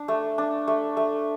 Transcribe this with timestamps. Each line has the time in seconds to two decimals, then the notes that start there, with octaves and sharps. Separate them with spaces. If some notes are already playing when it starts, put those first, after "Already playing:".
Already playing: D4
0.08 A3
0.38 D4
0.67 A3
0.97 A3